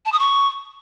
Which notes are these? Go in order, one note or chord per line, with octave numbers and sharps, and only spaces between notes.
A5
D#6
C#6